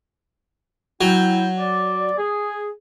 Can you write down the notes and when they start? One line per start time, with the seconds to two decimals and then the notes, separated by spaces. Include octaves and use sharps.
1.01 F#3 E4 G5
1.58 D5
2.17 G#4